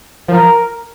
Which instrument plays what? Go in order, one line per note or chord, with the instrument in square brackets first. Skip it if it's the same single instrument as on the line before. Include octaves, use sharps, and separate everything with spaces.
[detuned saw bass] F3 [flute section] A#4